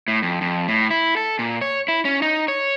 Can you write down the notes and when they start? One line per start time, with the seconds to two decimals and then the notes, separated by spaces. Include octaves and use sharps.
0.08 A2
0.22 F2
0.41 F2
0.68 A2
0.91 E4
1.17 A4
1.39 A#2
1.61 C#5
1.88 E4
2.05 C#4
2.22 D#4
2.48 C#5